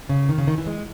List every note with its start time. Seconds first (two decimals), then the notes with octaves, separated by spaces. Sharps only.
0.09 C#3
0.29 D#3
0.38 C#3
0.47 D#3
0.58 E3
0.67 G#3